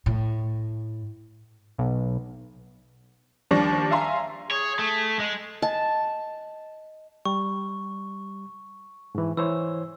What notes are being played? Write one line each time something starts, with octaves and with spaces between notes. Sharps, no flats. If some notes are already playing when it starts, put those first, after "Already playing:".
A2
B1
D#2 F3 G3 D4 C#6 A#6
E5 F5 G#5 A#5 C6
G#4 C#5
A3
G#3
D#5 A5
G3 C#6
G#2 E3
E3 C5 C#5 E6